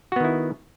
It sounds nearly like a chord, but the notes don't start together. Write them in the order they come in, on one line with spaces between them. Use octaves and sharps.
F#4 B3 D#3 E4